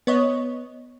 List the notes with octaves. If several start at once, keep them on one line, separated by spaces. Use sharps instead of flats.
B3 C#5 D#5